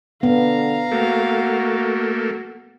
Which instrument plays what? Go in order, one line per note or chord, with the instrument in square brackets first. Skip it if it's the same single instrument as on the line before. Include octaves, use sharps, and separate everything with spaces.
[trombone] D3 [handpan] B3 [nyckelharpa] F5 A#5
[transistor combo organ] A3 A#3 [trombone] F#4